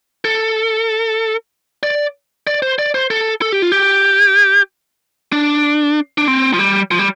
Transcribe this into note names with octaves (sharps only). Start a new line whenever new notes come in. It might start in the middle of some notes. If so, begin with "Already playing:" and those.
A4
D5
D5
C5
D5
C5
A4
A4
G4
F4
G4
D4
D4
C4
F3
G3
F3
G3